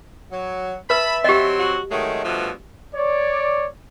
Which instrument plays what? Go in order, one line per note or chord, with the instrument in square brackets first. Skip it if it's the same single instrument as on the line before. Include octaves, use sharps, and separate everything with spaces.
[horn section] F#3
[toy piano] B4 [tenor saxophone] E5 [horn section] A5 B5
[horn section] F#3 C4 [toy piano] G4 D#5
[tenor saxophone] F#4
[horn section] D#3 F#3 G#3 [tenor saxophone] A3
[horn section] G2 B2 F3
[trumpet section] C#5 D5